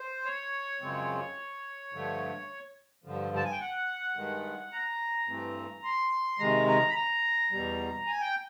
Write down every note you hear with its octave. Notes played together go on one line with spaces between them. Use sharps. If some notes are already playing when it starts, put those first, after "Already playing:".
Already playing: C5
C#5
F#2 C#3 F3 G#3 C4
G2 D3 F3 A3
G2 D3 F3
A5
G#5
G5
F#5
G2 D#3 G#3
A#5
G2 E3 A3 C4
C6
C3 D#3 G#3 A#5
A#5
B5
A#5
E2 B2 G3
G#5
G5